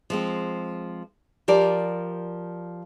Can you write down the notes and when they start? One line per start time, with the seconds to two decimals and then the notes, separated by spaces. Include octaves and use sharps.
0.10 F3 G#3 C4
1.48 F3 G4 A#4 D5